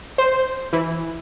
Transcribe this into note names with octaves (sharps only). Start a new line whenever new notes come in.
C5
E3